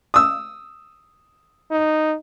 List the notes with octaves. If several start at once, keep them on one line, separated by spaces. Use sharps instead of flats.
D#6 E6
D#4